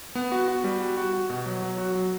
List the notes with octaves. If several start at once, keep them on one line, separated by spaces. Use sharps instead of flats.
B3
F#4
F#4
G3
F#4
F#4
F#4
B2
F#3
F#3
F#4
F#3